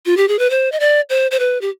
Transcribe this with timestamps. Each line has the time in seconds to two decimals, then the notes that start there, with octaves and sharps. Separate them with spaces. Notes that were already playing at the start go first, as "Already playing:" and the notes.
0.06 F4
0.17 G4
0.28 G#4
0.39 B4
0.50 C5
0.72 D#5
0.80 D5
1.09 C5
1.31 C5
1.39 B4
1.61 G4